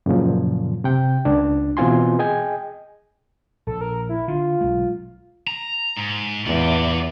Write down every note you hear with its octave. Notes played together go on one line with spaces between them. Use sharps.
F#2 A#2 C#3 F3
C3 G5
C#2 D4
B2 E3 C4 F4 G#5 C6
G#4 D#5 G5 G#5
A#1 A4
A#4
E4
D3 F4
B1 G#3
A#5
G#2
E2 F4 D5